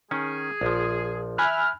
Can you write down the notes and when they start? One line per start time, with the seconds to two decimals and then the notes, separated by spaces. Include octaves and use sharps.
0.11 D#3 C#4 G#4
0.61 A#1 F3
1.38 E5 G#5 B5 F6 F#6